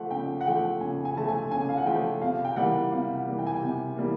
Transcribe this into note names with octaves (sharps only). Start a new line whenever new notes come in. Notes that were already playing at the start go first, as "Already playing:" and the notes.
Already playing: F3 A3 F#5
C#3 G5
F#5
F3 A3 G5
C#3 G#5
G#5
F3 A3 A5
G#5
C#3 G#5
F5
F#5
F3 A3 G5
C3 F5
G5
E3 G3 A#3 F#5
C3 F5
F#5
E3 G3 A#3
G5
G#5
G5
C3
E3 G3 A#3